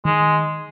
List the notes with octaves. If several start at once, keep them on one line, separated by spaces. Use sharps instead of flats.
D#3 G#3